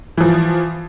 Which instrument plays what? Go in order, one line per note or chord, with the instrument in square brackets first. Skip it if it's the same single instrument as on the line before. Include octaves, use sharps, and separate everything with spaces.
[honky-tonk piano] E3 F3